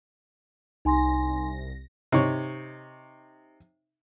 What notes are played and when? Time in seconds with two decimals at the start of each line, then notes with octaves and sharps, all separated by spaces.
0.85 C2 D#4 G#5 C6 A#6
2.12 C3 D#4 C#5